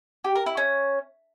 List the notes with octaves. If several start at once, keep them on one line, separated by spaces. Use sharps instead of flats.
G4
A#4
E4
C#4